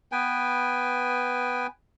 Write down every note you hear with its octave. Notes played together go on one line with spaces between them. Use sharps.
B3 B4 G5 G#5